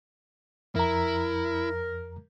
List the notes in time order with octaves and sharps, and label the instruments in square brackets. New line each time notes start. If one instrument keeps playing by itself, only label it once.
[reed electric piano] F2 A#5 [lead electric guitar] E4 [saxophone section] A#4